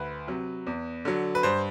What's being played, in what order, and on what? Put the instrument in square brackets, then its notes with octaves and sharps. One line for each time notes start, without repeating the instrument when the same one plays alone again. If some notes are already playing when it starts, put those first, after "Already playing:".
Already playing: [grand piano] D2 B4
C3 F#3
E2
D3 F#3
B4
G2 C5